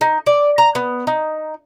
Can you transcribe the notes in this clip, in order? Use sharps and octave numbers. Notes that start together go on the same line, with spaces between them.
D#4
D5
A#5
B3
D#4